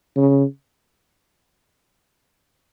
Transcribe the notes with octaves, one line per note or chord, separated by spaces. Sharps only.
C#3